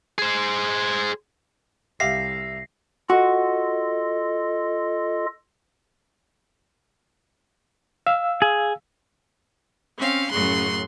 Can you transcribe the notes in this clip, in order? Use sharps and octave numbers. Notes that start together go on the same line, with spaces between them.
G#4 C5
C2 G4 E5 F5 A#6 C7
F4 F#4 A4 D#5
F5 E6
G#4
C4 C#4 F5
F#2 A2 C#3 C6 F#6